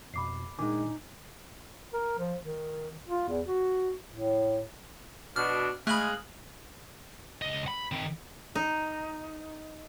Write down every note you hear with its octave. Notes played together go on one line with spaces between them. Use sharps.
F2 B2 B5 D6 C7
A#2 D#3 G#3 D4 D#4 G#5 D6
A#4
F3
D#3
F4
E2
F#4
A2
B2 D4 F6
G#3 A3 G#4 F5 B5 F#6 F#7
C#2 D#5
B5
D#3 C4
D#4